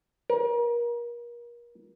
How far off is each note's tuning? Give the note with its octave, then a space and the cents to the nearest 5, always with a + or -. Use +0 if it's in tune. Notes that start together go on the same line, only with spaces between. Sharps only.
A#4 +35